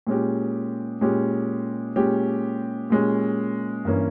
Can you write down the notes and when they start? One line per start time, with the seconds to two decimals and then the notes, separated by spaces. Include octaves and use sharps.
0.07 A#2 G#3 C#4 G4
1.01 A#2 G#3 C#4 G4
1.96 A#2 G#3 C#4 G4
2.90 A#2 G#3 C#4 G4
3.85 G2 E3 A#3 C#4